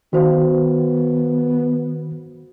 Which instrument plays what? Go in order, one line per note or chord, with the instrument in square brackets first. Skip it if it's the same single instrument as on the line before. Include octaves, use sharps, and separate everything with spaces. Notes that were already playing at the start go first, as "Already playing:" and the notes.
[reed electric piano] D#3 [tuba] B3 [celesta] F#4 C5 F5